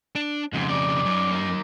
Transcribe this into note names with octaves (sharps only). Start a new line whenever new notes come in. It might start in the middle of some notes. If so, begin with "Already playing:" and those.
D4
F2 G#2 C#3
D#4 D5
F#2
A#3 D#4